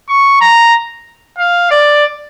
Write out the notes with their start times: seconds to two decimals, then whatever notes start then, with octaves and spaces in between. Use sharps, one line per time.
0.09 C#6
0.41 A#5
1.38 F5
1.71 D5